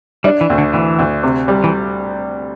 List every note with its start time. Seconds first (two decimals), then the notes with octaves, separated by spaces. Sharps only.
0.24 G3 D4
0.41 E3
0.50 D2
0.58 D3
0.73 D2 E3
0.99 D2
1.23 C3
1.48 G3
1.64 E3